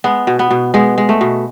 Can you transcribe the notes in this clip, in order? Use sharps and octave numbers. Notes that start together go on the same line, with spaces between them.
G#3 B3
B2
B3
B2
G#3 B3
G#3
A3
B2